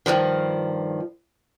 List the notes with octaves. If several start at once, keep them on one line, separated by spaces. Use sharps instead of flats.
G2 A#2 D#3 F3